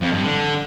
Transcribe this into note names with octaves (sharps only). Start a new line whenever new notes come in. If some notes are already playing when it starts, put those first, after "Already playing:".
F2
G2
D3